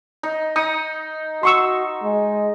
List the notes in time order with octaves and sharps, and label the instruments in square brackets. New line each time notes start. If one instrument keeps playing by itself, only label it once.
[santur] D#4
[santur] D#4 [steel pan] D#6
[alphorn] F#4 [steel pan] C6 C#6 E6
[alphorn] G#3